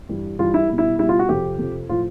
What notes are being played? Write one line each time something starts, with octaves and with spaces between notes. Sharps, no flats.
G2 E3 G3
G2 E3 G3 F4
E4
B2 G3
E4
B2 G3 E4
F4
F#4
F2 C3 F3 G4
F2 C3 F3
A2 F3 F4